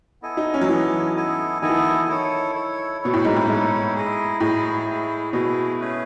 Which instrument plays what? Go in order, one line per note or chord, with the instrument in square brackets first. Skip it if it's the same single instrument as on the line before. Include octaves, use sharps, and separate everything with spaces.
[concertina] B3 E4 A4 D#5 G#5
[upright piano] D#4
C#4
F#3
[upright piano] E3 [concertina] B3 E4 A4 D#5 G#5
[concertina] B3 E4 A4 D#5 G#5
[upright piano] D#3 [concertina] B3 E4 A4 D#5 G#5
[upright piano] E3
D#3
[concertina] E4 A4 C#5
E4 A4 C#5
[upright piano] B2 [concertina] E4 A4 C#5
[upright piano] A2
G#2
A2
[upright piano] G#2 [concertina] E4 A4 C#5
[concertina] E4 G#4 D#5
[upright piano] A2 [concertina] E4 G#4 D#5
[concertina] E4 G#4 D#5
[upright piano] B2 [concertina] E4 G#4 D#5
[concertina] A3 C#4 G#4 B4